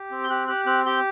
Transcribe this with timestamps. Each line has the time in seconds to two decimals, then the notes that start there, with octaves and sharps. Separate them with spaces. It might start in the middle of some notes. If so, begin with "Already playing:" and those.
Already playing: G4
0.11 C4
0.24 G6
0.30 G4 F#6
0.48 G4 F#6
0.66 C4 F#6
0.86 G4 G6